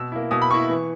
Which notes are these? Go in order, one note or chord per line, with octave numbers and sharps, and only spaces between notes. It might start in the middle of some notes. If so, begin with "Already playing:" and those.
Already playing: B2 E6
A#3 E4
B2 D#6
B5
A#3 E4 C#6
E3